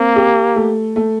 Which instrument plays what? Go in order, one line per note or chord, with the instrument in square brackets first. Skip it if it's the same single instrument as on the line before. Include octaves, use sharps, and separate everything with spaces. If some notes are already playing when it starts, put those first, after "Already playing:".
Already playing: [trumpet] A#3 [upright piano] C4
[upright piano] G4
A3
A3